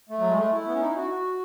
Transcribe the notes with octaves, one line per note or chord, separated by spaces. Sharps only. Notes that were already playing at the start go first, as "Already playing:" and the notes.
A3
F#3
G#3
A3
E4
B3
C#4
D#4
E4
F#4
F#4